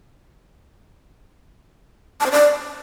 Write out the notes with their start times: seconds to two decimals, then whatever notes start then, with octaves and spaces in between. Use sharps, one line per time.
2.20 A5
2.26 C5
2.31 D5